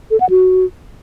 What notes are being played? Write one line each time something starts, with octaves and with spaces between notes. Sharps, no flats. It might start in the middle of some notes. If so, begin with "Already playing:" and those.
A4
F#5
F#4